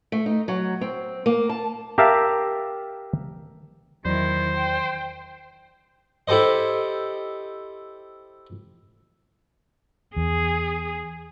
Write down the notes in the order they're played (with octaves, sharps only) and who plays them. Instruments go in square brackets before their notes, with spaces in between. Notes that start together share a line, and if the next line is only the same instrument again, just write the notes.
[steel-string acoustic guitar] A3
D#4
F#3
C4
A#3
A5
[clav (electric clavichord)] G4 A#4 E5 F5 A5
[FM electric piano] E2 F#3 D5 [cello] D#3 E4 [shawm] C5
[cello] G5
[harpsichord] E4 G4 A4 C5 D#5
[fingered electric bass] E2 [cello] G#4